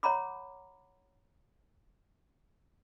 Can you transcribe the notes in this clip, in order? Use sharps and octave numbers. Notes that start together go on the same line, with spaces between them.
C#5 F#5 A#5 B5 D6